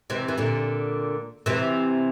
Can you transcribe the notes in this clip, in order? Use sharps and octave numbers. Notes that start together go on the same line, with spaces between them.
C3 E3
E3
A#2 D3
C3 E3